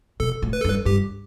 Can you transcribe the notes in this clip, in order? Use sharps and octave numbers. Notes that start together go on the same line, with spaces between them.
B2 A4
A2
B4
A4
G2
B4
G2 G4